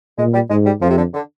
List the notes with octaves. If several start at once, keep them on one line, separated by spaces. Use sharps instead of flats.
A#2 G#3
G3
G#2 G#3
G3
F2 F3
C3
D3
D3